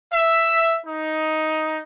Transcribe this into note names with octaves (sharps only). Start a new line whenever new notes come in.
E5
D#4